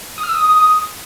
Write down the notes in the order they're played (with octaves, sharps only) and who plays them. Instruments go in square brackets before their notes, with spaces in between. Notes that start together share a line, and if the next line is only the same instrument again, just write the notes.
[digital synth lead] D#6
F6
E6
D#6